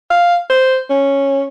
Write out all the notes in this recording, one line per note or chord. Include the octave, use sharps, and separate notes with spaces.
F5
C5
C#4